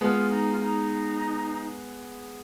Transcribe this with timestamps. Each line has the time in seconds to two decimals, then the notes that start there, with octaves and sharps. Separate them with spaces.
0.01 G#3 B3 F4
0.30 D#4
0.52 F4
0.60 D#4